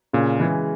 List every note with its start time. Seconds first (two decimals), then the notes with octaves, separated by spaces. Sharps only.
0.13 A#2 C#3
0.39 E3 G#3